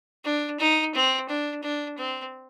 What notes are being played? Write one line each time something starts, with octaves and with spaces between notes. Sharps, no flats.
D4
D#4
C4
D4
D4
C4